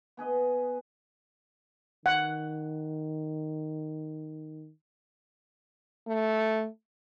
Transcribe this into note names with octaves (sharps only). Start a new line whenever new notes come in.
B3 G#4 B4 D#5
D#3 F#5
A3